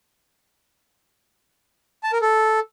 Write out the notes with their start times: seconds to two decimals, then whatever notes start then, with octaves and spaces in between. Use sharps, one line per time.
2.03 A5
2.12 A#4
2.22 A4